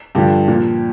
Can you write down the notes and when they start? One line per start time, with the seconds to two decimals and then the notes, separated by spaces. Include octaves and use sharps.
0.15 G2 D3 F3 G4
0.48 A#2 F3